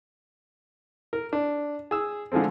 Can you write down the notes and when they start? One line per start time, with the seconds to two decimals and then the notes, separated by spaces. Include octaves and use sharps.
1.13 A#4
1.33 D4
1.91 G#4 E6
2.32 D3 F3 G#3 A3 C4